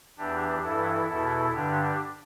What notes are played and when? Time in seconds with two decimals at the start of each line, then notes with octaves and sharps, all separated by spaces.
0.18 E2 E3 D4 G4
0.63 G2 E3 E4 A4
1.09 E2 B2 E4 A4
1.54 G2 D3 D4 G4